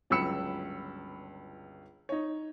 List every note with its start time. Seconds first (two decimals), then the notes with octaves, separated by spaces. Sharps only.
0.10 G1 C#2 F#3 B5 E6 C#7
2.09 D#4 C#5